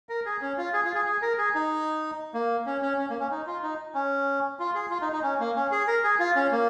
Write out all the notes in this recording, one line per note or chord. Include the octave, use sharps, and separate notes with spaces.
A#4
G#4
C#4
F4
G#4
F4
G#4
G#4
A#4
G#4
D#4
A#3
C#4
C#4
C#4
A#3
C#4
D#4
F4
D#4
C#4
F4
G#4
F4
D#4
D#4
C#4
A#3
C#4
G#4
A#4
G#4
F4
C#4
A#3